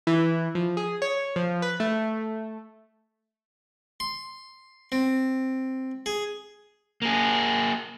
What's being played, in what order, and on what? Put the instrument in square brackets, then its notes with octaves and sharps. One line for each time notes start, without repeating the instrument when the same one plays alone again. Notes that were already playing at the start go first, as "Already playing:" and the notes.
[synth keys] E3
F3
G#4
C#5
F3
B4
A3
[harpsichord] C6
C4
G#4
[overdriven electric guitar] A#3 G#4